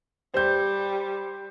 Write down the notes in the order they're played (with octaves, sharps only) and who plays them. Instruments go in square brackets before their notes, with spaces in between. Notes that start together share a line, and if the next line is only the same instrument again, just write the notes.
[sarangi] G3 [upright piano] C5 G6